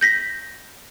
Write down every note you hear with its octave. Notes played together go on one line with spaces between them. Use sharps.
G6 A#6 B6